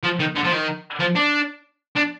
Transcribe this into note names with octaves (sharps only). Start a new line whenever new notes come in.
F3
D#3
D3
F3
D#3
F3
D4
D4